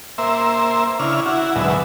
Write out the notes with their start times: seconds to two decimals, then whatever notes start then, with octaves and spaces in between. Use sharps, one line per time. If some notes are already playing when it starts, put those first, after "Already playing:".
0.18 A#3 C5 E5
0.99 C#3 D4 E4 F6
1.26 E4 F#4
1.55 D2 G#2 B2 F#3 E5